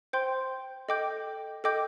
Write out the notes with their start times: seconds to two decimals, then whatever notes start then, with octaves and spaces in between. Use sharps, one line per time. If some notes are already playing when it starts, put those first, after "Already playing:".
0.13 C5 G5 C6 G6
0.89 A4 D#5 G5 D6 G6
1.64 A4 D#5 G5 D6 G6